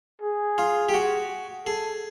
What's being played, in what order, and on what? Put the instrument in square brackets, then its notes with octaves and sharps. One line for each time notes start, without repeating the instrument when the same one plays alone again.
[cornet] G#4
[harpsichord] F4
G4
F#4
[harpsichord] G#4 [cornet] A4